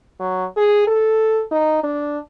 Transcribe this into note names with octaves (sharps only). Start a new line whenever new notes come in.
F#3
G#4
A4
D#4
D4